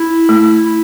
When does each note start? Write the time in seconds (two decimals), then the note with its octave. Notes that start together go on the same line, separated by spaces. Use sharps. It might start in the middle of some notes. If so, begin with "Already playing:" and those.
Already playing: E4
0.29 A3
0.65 E4